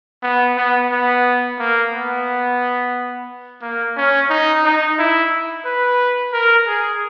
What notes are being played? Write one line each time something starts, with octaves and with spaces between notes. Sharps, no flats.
B3
B3
B3
A#3
B3
A#3
C#4
D#4
D#4
E4
B4
A#4
G#4